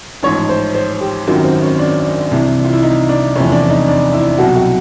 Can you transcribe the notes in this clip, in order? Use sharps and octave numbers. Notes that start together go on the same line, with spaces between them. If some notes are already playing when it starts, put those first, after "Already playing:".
A1 G#2 F3 C#5
C5
C5
G4
G#1 F#2 D#3 F#3 F4
C4
C#4
D4
C2 C3 E3
F4
E4
D#4
D4
F1 E2 C3 F3 C#4
D4
D#4
D4
E4
C2 B2 F#3 F#4
F#4